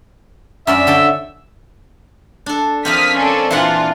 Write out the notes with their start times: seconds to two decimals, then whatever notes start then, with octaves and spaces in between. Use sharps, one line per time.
0.67 F#2 C#4 D5 E5
0.87 D3 A4 G5
2.46 D4 A4
2.85 F3 A#3 C4 D#6 F6 B6
3.14 C#4 D4 A4
3.51 A#2 E3 D4 F4 F#5